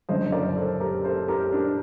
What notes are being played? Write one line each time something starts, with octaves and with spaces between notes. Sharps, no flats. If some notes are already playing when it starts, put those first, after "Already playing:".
F#1 F#2 D3 C5 D#5
A#4 D5
A4 C5
G4 A#4
A4 C5
G4 A#4
D4